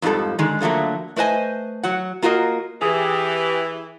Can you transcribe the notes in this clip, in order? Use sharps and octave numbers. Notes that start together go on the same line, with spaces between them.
F2 G#2 F3 G3 A4
D3 D#3 G#3
D3 F3 F#3 A3 A#3
A3 B4 C5 D#5 G#5
F#3 F#5
A#3 F4 F#4 A#4 D#5
E3 G4 G#4